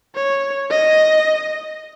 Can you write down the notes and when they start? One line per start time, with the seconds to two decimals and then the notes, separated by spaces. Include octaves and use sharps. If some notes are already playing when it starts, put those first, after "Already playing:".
0.15 C#5
0.71 D#5